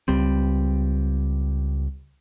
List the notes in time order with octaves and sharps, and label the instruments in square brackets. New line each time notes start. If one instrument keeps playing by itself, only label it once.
[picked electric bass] C#2 G3 C4